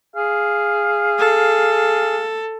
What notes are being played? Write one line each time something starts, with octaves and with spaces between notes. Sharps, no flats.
G#4 F5
A4